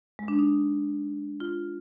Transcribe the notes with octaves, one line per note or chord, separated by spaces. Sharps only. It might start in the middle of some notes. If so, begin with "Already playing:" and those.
G#3
D4
D#4
F4